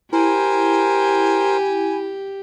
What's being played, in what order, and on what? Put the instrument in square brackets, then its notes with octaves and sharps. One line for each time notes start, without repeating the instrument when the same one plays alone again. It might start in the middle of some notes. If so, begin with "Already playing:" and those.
[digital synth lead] E4 [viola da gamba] G4 [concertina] A#4 C5 [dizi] G#5